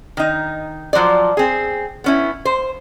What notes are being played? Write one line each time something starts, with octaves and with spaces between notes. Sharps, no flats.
D#3 D#4
F3 F#3 C5 D5
C4 G#4
B3 C#4 E4
C5